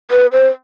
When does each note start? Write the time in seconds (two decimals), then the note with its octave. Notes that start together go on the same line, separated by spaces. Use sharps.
0.11 B4
0.32 C5